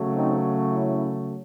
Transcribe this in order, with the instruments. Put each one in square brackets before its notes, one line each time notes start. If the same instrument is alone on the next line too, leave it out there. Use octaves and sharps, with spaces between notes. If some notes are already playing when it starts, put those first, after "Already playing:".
Already playing: [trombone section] C#3 F#3 A3
C4 D#4
C#4 E4